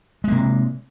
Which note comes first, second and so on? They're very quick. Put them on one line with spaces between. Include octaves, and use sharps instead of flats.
G#3 A#3 C3